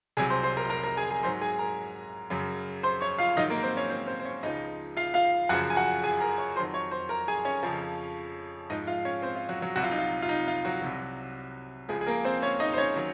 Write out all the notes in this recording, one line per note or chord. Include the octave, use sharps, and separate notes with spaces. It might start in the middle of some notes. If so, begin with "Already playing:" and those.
C2 C3 F#3 G#4 G#5
C5 C6
C5 C6
A#4 A#5
C6
A#4 A#5
A#4 A#5
G#4 G#5
G#4 G#5
G#2 F#3 C5 C6
G#4 G#5
A#4 A#5
F#2 C#3 F#3
C5 C6
C#5 C#6
F4 F5
G#2 D#3 F#3 D#4 D#5
A#3 A#4
C4 C5
C#4 C#5
C4 C5
C4 C5
C5
C#4 C#5
C#2 C#3 F3 D#4 D#5
F4 F5
F4 F5
F#2 C#3 F3 F#4 F#5
G#5
F#4 F#5
G#4 G#5
A#4 A#5
C#5 C#6
F2 D#3 F#3 C5 C6
C#5 C#6
C5 C6
A#4 A#5
G#4 G#5
C#4 C#5
F2 C#3 F3
G#2 F3 D#4 D#5
F4 F5
C#4 C#5
C4 C5
F4
F#3 F#4
F#3 F#4
C2 C3 F#3 F#4
F4
D#4
F4
F4
D#4
F4
F#3 F#4
C2 C3 F#3
C#2 C#3 F3 G#3 G#4
G#4
A#3 A#4
C4 C5
C#4 C#5
D#4 D#5
C5
C#4 C#5
D#3 F#3